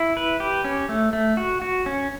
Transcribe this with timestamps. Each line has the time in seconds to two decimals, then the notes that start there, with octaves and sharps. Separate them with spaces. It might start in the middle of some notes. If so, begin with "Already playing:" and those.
Already playing: E4
0.17 B4
0.40 G4
0.64 C#4
0.89 A3
1.13 A3
1.37 F#4
1.62 F#4
1.86 C#4